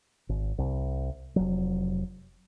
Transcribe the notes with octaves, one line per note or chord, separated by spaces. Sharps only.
G#1
C2
F1 F#3